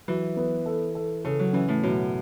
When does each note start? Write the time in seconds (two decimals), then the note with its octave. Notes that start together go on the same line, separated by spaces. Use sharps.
0.08 E3 F#3
0.37 B3
0.66 A4
0.95 A4
1.25 C#3 A4
1.39 F#3
1.53 E3 C#4
1.68 A2
1.83 F#2 B2